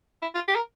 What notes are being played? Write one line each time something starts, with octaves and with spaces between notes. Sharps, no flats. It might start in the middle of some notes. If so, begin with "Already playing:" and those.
E4
F4
G4
A#4